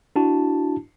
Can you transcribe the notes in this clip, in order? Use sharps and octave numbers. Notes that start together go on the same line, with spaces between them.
D4 E4 F#4 A5